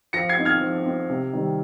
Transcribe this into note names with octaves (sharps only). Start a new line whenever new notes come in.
F3 A#6 C#7
G#6 C7
C4 D#4
F6 G#6
F3
C4 D#4
C3
D#3 G3 C4